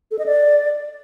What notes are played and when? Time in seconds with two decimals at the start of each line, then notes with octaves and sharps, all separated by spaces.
0.11 A4
0.19 D#5
0.26 D5